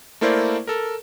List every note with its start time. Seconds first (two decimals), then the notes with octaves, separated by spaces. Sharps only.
0.21 A3 A#3 E4 A#4 C5 D5
0.67 A4 A#4